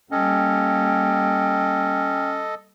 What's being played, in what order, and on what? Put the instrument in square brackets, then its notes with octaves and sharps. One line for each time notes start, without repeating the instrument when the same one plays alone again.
[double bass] G3 A#3 [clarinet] C#4 [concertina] A4 D#5 [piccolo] G5